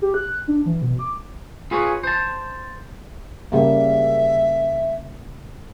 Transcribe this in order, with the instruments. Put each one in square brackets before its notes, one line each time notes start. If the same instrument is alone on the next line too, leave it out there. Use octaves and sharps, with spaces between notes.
[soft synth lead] G4
F#6
D4
E3
B2
D6
[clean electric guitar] F4 G#4 B4 C#5
C5 A5
[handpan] C#3 G3 A#3 [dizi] E5